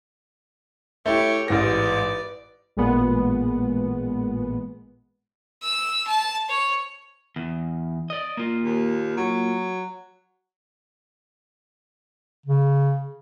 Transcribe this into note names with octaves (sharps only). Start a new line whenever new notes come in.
A3 E4 G4 C#5
A1 G#2 B4 D5 A#6
A1 A#2 G#3 B3
E6
A5
C#5
E2
D5 D#5
A#3 F4
D#2
F#3
C#3